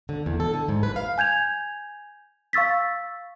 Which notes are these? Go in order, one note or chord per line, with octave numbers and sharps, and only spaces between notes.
D3
E2
A4
D3
G#2
B4
F5
G#5 G6 G#6 F7
F5 C#6 E6 A6 B6